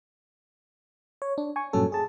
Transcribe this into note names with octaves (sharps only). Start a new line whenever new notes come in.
C#5
D4
G#5 C#6
G2 A#2 F#3 C#4 A4
G#4 A5